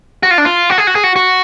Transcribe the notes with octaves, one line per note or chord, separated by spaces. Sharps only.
F#4
F4
D4
F4
F#4
G#4
F#4
G#4
F#4
F#4